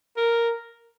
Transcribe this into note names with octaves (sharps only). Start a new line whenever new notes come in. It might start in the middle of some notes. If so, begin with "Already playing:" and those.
A#4